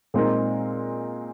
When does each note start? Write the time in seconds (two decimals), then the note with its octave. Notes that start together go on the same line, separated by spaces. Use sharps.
0.14 A#2 G#3 C4 D#4 A#4